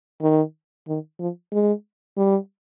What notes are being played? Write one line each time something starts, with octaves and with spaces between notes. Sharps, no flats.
D#3
D#3
F3
G#3
G3